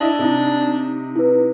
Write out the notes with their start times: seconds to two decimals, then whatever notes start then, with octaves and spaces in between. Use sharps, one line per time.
0.01 D4 E4 D#5
0.19 C3 D#4
1.16 E4 B4